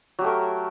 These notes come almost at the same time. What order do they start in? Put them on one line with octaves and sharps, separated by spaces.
F#3 G4 A3 A#4